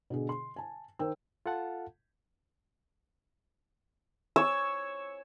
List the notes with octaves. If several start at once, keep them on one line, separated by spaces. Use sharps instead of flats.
B2 D3 G#4
C6
G#5 A5
D#3 A#4 C5 G5 E6
F4 A4 F5 F#5 A5
C#5 E6